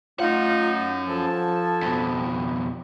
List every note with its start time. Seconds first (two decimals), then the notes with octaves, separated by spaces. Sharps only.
0.20 A3 C#4 D#4 F4 F#5
1.07 F3 A4 G#5 A5
1.82 F2 B2